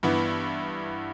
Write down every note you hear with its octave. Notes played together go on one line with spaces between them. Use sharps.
G2 E3 B3 E4